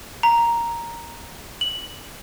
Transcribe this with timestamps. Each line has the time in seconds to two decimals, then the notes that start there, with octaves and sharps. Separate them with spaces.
0.23 A#5
1.61 F#7